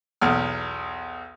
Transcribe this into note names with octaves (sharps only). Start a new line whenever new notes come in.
B1 E2 F6